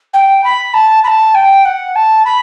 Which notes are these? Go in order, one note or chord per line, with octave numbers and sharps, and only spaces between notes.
G5
B5
A5
B5
A5
G5
F#5
A5
B5